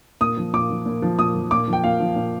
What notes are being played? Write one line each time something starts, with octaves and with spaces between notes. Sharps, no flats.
A#2 D#6
F3
A#2 D6
F3
A#2
F3
A#2 D#6
F3
A#2 D6
F3
G5
A#2 F5
F3
A#2